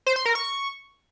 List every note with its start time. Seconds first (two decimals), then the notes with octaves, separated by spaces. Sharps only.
0.06 C5
0.16 C6
0.26 A#4
0.35 C#6